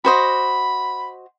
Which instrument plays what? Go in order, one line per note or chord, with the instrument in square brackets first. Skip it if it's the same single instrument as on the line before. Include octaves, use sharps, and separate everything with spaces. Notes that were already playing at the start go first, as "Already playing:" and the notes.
[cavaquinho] F#4 C5 D#5 [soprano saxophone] B5